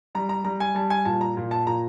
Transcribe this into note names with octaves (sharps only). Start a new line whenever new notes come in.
G3 A#5
A#5
G3 A#5
G#5
G3 A5
G#5
A#2 A5
A#5
A#2
A5
A#2 A#5